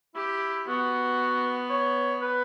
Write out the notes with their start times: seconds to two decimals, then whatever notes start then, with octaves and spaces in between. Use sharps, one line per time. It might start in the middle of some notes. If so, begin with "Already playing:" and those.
0.15 E4 G4
0.67 B3 F#4
1.70 C#5
2.22 B4